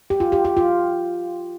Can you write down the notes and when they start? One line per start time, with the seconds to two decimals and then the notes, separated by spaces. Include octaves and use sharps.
0.10 G4
0.20 F4
0.32 G4
0.45 G4
0.57 F4